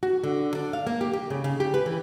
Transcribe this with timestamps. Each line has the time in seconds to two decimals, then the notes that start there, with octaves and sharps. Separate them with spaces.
0.03 F#4
0.24 D3
0.55 D4
0.73 F5
0.87 A#3
1.01 G4
1.13 G4
1.30 C#3
1.44 C#3
1.60 G4
1.74 B4
1.86 E3